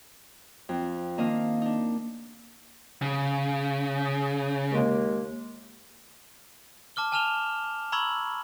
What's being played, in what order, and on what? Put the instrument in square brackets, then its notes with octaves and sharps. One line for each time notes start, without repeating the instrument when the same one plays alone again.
[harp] F2 C4
D#3 A#3 D4 D#5 F5
D4 D#4
[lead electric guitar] C#3
[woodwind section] D#2 G#3 A#3
[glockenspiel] A5 D6 F6 G7
G#5 A5 F6 E7 F7 G7
A#5 B5 C#6 E6 G#6 F#7